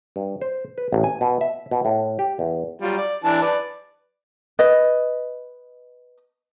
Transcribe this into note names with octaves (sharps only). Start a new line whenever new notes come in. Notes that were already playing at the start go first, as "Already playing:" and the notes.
G2
C5
B4
A1
G#5
B2
E5
B2
A2
G4
E2
F#3 G3 F4
D5
E3 D4 A5
B4 D5
B4 D#5